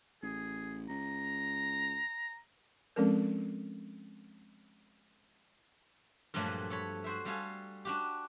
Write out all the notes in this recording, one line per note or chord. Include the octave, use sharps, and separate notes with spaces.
A1 G#4
C#2 A#5
F3 G#3 C4 C#4 A4 A#4
G2 A#2 F3 F#3 A3
A4 C#5 B5
F#4 C5 E5
G3 F#4 A4 F5 G#5
D4 F#4 G4